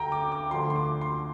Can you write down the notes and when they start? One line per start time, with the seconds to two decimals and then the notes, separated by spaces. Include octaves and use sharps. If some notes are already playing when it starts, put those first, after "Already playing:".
Already playing: D2 G5 A#5
0.12 D6
0.32 D6
0.50 D2 D3 F3 C6
0.70 C6
0.76 D6
1.01 C6